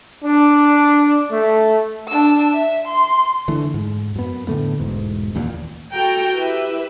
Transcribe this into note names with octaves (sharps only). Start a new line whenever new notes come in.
D4
A3
D4 E6
E5
C6
D3 E3 A3
G#2
F#2 B3
A2 D3 A3 B3
E1 G#2
A1 D#2 A#2
F#4 A4 G5 A#5
E4 G4 B4 E5